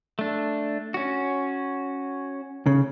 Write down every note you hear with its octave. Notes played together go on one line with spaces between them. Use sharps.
A3 D4
C#4 F#4
C#3